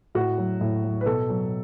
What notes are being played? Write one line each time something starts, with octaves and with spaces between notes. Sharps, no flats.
A2 F#4
F#3
A2
F#3
B4
B2 A4
F#3